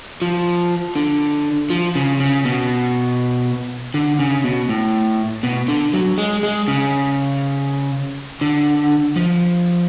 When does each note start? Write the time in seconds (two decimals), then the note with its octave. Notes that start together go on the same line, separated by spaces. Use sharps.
0.22 F3
0.96 D3
1.70 F3
1.95 C#3
2.20 C#3
2.45 B2
3.94 D3
4.19 C#3
4.44 B2
4.69 A2
5.43 B2
5.68 D3
5.93 F#3
6.18 G#3
6.43 G#3
6.68 C#3
8.41 D3
9.16 F3